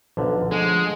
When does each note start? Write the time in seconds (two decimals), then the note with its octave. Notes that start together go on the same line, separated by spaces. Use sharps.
0.17 B1 D3 F3
0.51 D3 G#3